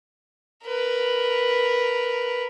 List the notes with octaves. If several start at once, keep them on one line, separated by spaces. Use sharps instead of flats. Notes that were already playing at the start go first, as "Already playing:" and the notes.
A#4 B4